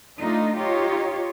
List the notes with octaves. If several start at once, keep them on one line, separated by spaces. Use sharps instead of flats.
A3 D4 D#4 F4
D#4 F4 G4 C#5